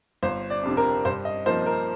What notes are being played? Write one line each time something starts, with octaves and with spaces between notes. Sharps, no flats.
G1 C5
D5
F2 C3 G3 D4
A#4
G2 C5
D#5
F3 A#3 D#4 C5
A#4